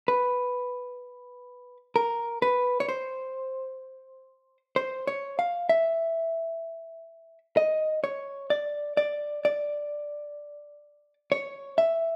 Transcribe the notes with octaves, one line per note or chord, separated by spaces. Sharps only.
B4
A#4
B4
C#5
C5
C5
C#5
F5
E5
D#5
C#5
D5
D5
D5
C#5
E5